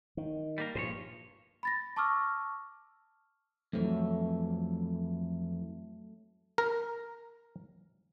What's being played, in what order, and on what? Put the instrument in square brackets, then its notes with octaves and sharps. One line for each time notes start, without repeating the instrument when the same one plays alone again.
[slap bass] D#3
[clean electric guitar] G3 A#3 A#4
[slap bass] G2 A#2 [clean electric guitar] F3 C5 C#5
[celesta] B5 A6 A#6
A5 C#6 D6 E6 F6
[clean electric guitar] F2 E3 [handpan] F#3 A3
[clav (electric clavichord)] A#4